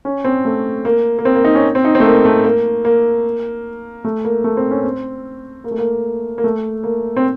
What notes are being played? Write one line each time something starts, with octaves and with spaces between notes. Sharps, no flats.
C#4
C4
A3
A#3
A#3
C4
A#3
D#4
C#4
C4
D#4
C4
A3
A#3
A3
A#3
A#3
A3
A#3
A3
C4
C#4
C4
A#3
A3
A#3
A#3
A3
A#3
C4